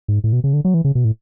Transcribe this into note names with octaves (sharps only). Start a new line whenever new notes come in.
G#2
A2
B2
C#3
D3
F#3
E3
C#3
B2
A2